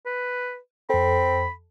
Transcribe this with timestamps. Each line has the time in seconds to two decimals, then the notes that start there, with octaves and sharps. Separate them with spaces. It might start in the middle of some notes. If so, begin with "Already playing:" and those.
0.06 B4
0.90 F2 C4 A4 B5